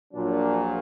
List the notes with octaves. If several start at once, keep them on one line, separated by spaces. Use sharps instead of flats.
A#1 A#2 F#3 D4